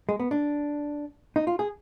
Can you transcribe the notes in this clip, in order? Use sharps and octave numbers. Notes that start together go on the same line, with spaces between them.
G#3
B3
D4
D#4
F4
G#4